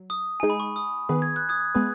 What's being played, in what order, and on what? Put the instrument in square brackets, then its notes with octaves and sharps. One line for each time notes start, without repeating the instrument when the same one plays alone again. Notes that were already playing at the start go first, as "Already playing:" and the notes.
Already playing: [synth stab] F#3
[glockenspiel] D#6
[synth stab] G#3 D#4 G#4 [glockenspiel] G#5
[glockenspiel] B5
C#6
D#6
[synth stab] D#3 B3 G#4 B4
[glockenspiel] G#6
F#6
D#6 G#6
[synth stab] G#3 B3 G#4 B4